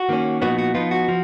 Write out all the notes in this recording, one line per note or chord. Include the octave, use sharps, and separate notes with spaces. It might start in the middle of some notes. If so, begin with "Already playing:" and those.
Already playing: F#4
D#3 A#3 C#4
A#2 F3 B3 D#4 F#4
F#4
F3 B3 D#4 F4
F#4
F3